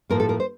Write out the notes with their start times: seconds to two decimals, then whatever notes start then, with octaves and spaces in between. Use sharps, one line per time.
0.10 A2 F3 A#3 A#4
0.20 A4
0.29 A#4
0.40 C5